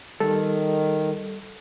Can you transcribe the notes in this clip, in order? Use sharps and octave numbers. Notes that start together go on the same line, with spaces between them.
D#3 G3 A4